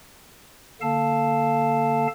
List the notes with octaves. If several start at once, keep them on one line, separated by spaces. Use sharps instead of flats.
D3 A#3 A4 F5 A5